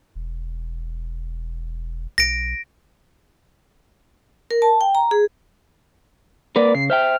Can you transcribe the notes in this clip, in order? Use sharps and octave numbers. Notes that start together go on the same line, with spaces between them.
E1
B1 A#6 D7
A#4
A5
G5
A#5
G#4
A#3 A#4 B4 D5
C#3 C7
C5 E5 G5 F6